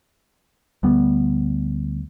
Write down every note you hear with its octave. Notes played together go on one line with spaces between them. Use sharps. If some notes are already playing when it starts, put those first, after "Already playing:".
D2 G3 B3